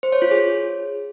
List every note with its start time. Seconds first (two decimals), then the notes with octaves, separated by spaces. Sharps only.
0.03 C5
0.12 C#5
0.22 F4
0.31 G#4